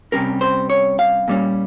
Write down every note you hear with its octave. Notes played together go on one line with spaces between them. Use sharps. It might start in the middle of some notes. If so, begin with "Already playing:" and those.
C3 G3 C#4 A#4
C5
C#5
F5
A#2 G3 C#4